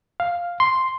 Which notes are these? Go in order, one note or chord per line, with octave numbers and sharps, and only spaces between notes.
F5
C6